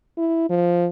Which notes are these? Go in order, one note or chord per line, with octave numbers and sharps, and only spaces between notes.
E4
F3